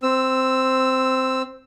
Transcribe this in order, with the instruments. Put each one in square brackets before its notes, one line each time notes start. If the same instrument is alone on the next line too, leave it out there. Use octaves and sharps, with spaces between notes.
[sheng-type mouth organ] C4 E6